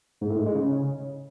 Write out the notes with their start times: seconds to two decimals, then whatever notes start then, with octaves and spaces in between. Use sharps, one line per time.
0.21 G#2
0.30 A2
0.38 G#2
0.46 G#3
0.55 C#3